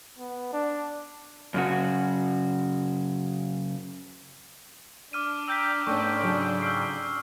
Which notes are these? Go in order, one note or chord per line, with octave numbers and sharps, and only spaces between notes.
B3
D4
F#2 C#3 F#4
D4 D6 F6 D#7
G5 A#5 E6 G6 B6
G#2 A3 B3 C#4 G5 C#6
C#3 F#3 A4
E6 F6 C7